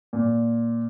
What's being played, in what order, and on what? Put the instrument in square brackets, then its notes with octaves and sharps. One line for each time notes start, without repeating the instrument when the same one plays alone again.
[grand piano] A#2